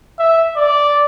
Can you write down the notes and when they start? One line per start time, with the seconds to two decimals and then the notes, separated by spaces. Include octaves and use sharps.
0.19 E5
0.57 D5